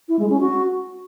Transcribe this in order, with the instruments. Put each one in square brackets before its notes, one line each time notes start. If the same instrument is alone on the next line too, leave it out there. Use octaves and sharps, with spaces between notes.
[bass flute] E4
G#3
C#4
F#4